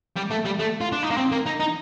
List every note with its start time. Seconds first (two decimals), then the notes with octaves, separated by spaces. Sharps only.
0.17 G3
0.31 A3
0.45 G3
0.59 A3
0.81 F4
0.92 D4
1.03 D#4
1.11 A#3
1.17 C4
1.32 A#3
1.47 D#4
1.60 D#4